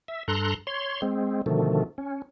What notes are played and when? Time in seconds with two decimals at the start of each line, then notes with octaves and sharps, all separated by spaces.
0.08 E5
0.28 G2 A4 A#5 C6 F#6
0.67 C#5 C6
1.02 G#3 C4
1.46 B2 D3 D#3 F3 A3
1.98 C#4